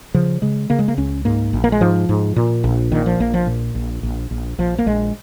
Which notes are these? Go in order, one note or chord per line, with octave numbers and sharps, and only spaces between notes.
C#3 F3
C#3 G#3
C#3 A#3
G#3
A#3
C#2 C#4
G#2 A#3
A#1
A#3
G#3
G#2 F3
G#2
A#2
A#1
A#2 D#3
F3
A#1 A#3
F3
A#2
A#1
A#1
A#1
A#1 F3
A#3
A#1 G#3